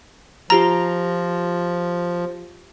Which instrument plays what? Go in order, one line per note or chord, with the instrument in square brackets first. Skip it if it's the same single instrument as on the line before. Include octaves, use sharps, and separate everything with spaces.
[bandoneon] F3 [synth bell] F4 G4 A#6 [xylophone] A#5